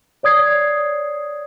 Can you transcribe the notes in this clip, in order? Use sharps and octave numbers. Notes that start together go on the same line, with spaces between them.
C#5 D5 D#6 G#6 C7